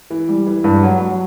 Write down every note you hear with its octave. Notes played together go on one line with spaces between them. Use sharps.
E3
G3
E3
G2
F#3
F#3